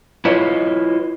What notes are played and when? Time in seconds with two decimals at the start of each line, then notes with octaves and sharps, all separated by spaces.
0.25 E4 F4 B4 C#5 D#5